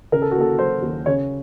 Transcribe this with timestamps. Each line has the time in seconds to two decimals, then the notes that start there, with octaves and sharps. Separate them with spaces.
0.12 C#3 A#4
0.22 A4
0.31 F#4
0.36 A#3 A4
0.59 F#3 C5
0.82 D#2
1.06 C#3 C#5